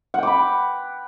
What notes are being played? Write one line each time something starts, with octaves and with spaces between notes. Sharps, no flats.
F#5 G5 B5 D6